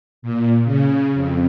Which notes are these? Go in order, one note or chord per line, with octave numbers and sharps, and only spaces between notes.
A#2
C#3
F2